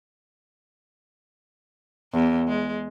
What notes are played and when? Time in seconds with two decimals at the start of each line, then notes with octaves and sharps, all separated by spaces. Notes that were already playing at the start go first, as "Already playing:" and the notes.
2.13 E2
2.48 G#3